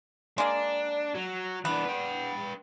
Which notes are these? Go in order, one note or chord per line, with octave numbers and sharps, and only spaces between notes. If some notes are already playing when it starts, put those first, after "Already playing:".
G#3 A#3 D4
F#3
E3 B3 D4
B4 G5